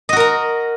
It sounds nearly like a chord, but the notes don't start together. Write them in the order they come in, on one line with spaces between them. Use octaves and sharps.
D#5 F#4 A#4 A#5